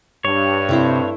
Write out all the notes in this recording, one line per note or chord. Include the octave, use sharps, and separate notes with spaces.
G2 C#5
C3 A3 E4 C5